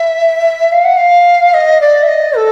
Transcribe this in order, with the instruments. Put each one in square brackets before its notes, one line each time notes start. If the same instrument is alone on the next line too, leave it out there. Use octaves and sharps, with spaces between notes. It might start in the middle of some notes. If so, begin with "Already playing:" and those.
Already playing: [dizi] E5
F5
F#5
F5
D#5
D5
E5
D#5
A4